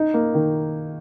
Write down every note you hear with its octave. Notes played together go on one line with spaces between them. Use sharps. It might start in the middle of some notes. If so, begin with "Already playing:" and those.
Already playing: D#4
A#3
D#3